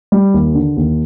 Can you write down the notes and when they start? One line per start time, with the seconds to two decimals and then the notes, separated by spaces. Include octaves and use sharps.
0.12 G3
0.34 D#2
0.55 D3
0.77 D#2